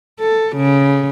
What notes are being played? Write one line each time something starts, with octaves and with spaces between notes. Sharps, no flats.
A4
C#3